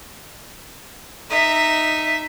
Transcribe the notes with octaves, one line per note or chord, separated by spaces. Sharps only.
D#4 E5